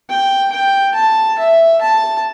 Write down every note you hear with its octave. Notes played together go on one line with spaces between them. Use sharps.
G5
G5
A5
E5
A5